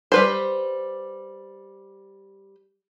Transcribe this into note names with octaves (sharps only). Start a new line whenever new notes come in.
G3 B4 C5